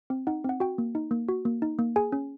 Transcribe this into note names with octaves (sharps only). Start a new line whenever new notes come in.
C4
D#4 F#5
C4 F#5
F#4 G5
A#3
D#4
A#3
F#4
A#3
D#4
A#3
G#4 G#5
C#4